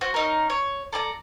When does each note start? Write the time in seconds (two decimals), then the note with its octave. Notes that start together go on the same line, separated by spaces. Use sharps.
0.01 F#4 C5
0.14 C#4 D#4 A#4
0.50 C#5
0.93 A4 D5 A5 A#5